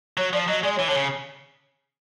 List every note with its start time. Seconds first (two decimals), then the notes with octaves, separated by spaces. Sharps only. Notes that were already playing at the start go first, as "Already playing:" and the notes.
0.17 F#3 C#5
0.33 F3 D5
0.48 F#3 D#5
0.63 G#3 D5
0.76 C#5
0.79 E3
0.88 D3 C#5
0.95 C#3